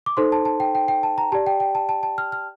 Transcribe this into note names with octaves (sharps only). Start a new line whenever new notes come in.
D6
D#4 A4 C5 C6
A5
A5
G5
G5
G5
A5
A#5
G4 D5 A5
G5
G5
A5
A5
A5
F6
F6